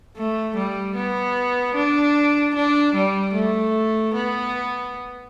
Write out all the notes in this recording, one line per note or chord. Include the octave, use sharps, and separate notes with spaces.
A3
G3
B3
D4
D4
G3
A3
B3